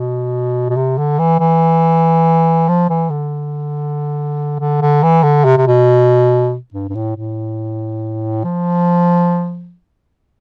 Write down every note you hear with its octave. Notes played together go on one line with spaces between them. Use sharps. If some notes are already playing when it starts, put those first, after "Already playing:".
Already playing: B2
B2
C3
D3
E3
E3
F3
E3
D3
D3
D3
E3
D3
C3
C3
B2
G2
G2
A2
A2
F3